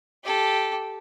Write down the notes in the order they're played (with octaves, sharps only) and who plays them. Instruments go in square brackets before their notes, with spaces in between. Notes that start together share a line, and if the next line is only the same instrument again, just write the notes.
[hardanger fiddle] G4 A4